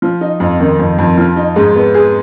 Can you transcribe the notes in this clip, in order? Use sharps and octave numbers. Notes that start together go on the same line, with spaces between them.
F3
D#4
F2
D#3
F2
F2
F3
D#4
G#2
B3
G#4